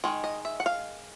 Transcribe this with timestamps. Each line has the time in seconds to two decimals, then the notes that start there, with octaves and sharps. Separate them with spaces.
0.04 D#3 G#3
0.24 D#5
0.45 E5
0.60 F#5
0.66 F5